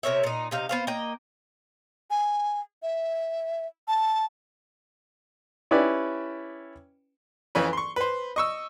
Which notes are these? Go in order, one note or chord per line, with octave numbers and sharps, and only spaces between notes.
C3 A#4 C#5 E5
A#2 D#4
C3 D#4 F5
B3 C5 F5
A#3 D#5 G5
G#5
E5
A5
C#4 E4 G4 B4 D5
F2 E3 C#4 B4
C6 C#6
B4 C5
D#5 C#6 E6